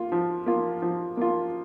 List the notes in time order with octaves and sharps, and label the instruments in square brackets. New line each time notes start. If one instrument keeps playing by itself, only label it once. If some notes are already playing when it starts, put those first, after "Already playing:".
Already playing: [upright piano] A#3 F4
F3
A#3 F4
F3
A#3 F4